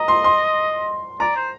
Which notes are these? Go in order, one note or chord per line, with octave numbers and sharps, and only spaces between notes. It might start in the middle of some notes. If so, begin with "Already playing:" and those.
Already playing: D#5 A#5
C6
C6
D5 A#5
C5